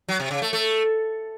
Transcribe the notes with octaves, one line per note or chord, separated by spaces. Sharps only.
F#3
C3
C#3
A3
A3